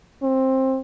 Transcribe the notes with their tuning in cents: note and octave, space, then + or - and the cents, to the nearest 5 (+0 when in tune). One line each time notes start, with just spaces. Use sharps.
C4 +15